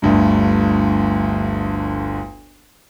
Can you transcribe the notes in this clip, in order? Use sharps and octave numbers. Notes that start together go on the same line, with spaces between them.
G1 D2 G2